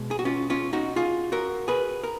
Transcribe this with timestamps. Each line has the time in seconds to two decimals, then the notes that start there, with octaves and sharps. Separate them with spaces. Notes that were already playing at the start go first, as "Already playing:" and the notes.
Already playing: B2 G#3
0.11 G#4
0.19 F#4
0.25 C#4 F4
0.50 C#4 F4
0.73 D#4 F#4
0.96 F4 G#4
1.32 F#4 A#4
1.68 G#4 B4
2.04 A#4